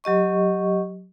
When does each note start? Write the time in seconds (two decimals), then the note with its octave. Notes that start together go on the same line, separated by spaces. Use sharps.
0.04 F#3 G4 D#5 C#6